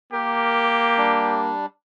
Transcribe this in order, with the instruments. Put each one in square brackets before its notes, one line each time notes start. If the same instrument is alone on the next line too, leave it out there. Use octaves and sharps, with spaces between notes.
[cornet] A#3 [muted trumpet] G4 [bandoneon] A#4
[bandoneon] G3 D4